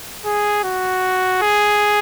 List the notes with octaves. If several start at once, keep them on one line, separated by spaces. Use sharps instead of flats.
G#4
F#4
G#4